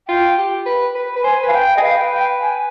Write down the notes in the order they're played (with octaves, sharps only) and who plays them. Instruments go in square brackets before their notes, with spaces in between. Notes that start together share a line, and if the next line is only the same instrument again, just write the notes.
[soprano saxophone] F4 [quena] G5
[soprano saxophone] G4
B4
B4
B4
[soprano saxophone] C5 [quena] G#5
[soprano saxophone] B4 [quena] F5
[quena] G5
[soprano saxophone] G#4 [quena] D#5
[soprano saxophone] B4 [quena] F5
[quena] G5
G5
G#5